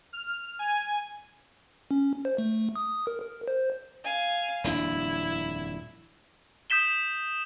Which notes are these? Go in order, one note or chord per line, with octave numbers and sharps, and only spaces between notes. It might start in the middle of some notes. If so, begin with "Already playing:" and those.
F6
G#5
C#4
C5
A3
D#6
A#4
A#4
C5
F5 G#5
D#1 F2 D4 E4
D#6 G6 B6 E7 G7